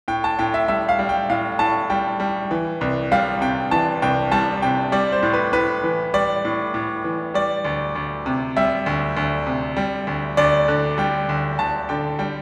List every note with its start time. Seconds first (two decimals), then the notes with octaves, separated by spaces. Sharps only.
0.08 A2 G5
0.24 A5
0.39 A2 G5
0.54 E5
0.68 G3 E5
0.89 F5
0.99 G3
1.09 G5
1.30 A2 F5
1.59 A2 A5
1.90 G3 G5
2.20 G3
2.51 E3
2.81 C2
3.12 G3 F5
3.41 C3 G5
3.71 E3 A5
4.02 C2 G5
4.32 G3 A5
4.62 C3 G5
4.92 G3 D5
5.12 C5
5.23 A2
5.34 B4
5.53 A2 B4
5.83 E3
6.14 G3 D5
6.45 A2
6.74 A2
7.04 E3
7.34 G3 D5
7.65 D2
7.96 D2
8.26 C3
8.56 G3 E5
8.86 D2
9.17 D2
9.47 C3
9.77 G3
10.07 D2
10.37 D2 D5
10.68 D3
10.98 G3 G5
11.29 D2
11.59 D2 A5
11.89 D3 G5
12.19 G3 G5